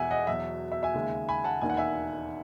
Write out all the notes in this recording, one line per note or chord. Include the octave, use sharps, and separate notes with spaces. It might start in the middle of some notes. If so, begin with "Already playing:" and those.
Already playing: E2 B2 G#3 E5 F#5 G#5
D#5 F#5
E2 B2 F#3 E5
E5
E5 G#5
D#2 C#3 G#3
G#5 B5
F#5 A5
E1 D#2 D#3 G#5
F#5
E5 G#5